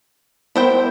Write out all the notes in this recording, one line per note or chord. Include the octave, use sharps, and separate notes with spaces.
B3 E4 A#4 C5 G5